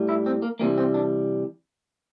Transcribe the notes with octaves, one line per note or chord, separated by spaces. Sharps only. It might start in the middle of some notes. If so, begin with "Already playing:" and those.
Already playing: A2 G3
E4
C4
A#3
C3 E3 G3 A#3
C4
D4